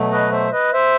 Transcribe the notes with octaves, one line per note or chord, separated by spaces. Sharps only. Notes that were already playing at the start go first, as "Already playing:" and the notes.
Already playing: B2 F#3 A3
B4 D#5
C5 E5
B4 D#5
C5 E5